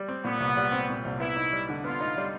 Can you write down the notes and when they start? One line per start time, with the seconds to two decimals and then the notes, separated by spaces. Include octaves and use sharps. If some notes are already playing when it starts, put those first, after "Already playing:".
Already playing: G3
0.09 C4
0.24 A#2 B3
0.40 C2
0.57 G3
0.72 C4
0.89 A#2
1.05 C2
1.20 B3 E4
1.36 D#4
1.53 G3
1.69 D3
1.84 B3 F4
2.00 D#4
2.17 G3